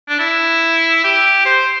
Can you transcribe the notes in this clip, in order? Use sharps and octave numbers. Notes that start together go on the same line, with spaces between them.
D4
E4
G4
C5